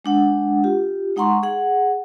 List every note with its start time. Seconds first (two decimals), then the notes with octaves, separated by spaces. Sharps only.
0.05 G#3 D4 F#5
0.64 F4 G4
1.16 G#3 D#4 F#5 A#5 C6 C#6
1.43 G#4 F#5